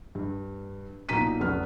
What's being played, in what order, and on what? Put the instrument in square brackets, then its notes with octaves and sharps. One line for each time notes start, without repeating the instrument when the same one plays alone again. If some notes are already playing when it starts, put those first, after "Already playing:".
[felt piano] G2
B1 A#2 D#4 A#5 B6 D#7
F1 B1 C#3 F#3 B3 F6